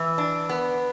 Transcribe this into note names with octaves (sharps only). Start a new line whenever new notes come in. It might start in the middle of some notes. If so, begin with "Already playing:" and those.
Already playing: E3
D4
B3